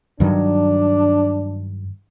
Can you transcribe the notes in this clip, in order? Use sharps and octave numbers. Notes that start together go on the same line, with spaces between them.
G2 D#3 F#3 D4